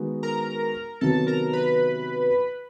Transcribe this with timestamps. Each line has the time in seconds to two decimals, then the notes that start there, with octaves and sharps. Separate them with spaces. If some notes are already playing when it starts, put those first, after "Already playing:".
Already playing: D#3 G#3 B3 D#4 F#4
0.23 A#4 A#5
1.01 C3 D#3 F#3 B3 A4 A5
1.27 A#4 A#5
1.53 B4 B5